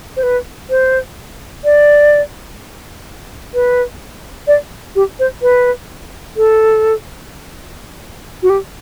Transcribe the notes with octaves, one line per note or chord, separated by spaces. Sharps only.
C5
B4
C5
D5
B4
D5
G4
C5
B4
A4
F#4
G4